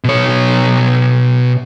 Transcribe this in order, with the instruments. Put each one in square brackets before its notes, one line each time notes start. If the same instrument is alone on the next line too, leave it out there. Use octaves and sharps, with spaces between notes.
[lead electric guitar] B2 C#5